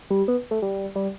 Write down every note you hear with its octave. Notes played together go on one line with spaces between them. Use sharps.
G3
B3
A3
G3
G3